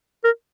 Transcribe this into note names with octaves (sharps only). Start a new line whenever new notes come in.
A#4